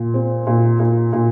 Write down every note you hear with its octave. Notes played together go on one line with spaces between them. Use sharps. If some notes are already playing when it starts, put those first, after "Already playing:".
Already playing: A#2
C4
A#2
A#2
A#2